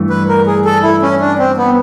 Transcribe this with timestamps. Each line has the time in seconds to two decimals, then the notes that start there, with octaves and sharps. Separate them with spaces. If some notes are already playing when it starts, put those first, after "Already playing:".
Already playing: G2 E3 A3
0.10 B4
0.28 A#4
0.47 G#4
0.65 A4
0.83 E4
1.02 C#4
1.21 D4
1.39 C4
1.57 B3